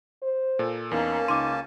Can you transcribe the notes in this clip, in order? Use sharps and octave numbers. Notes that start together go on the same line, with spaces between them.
C5
A#2 A4
E2 A#3 C#4 D#4 A#4 A5
C#2 D#4 C6 D6 D#7